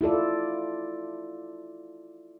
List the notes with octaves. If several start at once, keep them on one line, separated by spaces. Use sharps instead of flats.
E4 F4 A4 D5